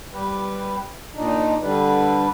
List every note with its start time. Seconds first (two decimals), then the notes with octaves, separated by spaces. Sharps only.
0.13 G3 G4 B4
1.15 A#2 D4 D#4
1.62 D3 G3 D4 B4